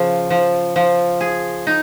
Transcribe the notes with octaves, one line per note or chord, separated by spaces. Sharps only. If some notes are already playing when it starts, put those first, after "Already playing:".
Already playing: C#3 F3
F3
F3
G#4
D#4